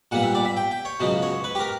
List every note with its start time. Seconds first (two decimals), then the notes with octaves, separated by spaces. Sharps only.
0.11 A#2 G3 B3 F#5
0.23 E5
0.35 D5
0.45 E5
0.57 G5
0.71 G5
0.85 C#5
1.00 C#2 B2 F#3 B3
1.22 C#5
1.44 B4
1.55 G4
1.59 A#4